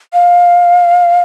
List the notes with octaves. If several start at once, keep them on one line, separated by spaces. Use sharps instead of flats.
F5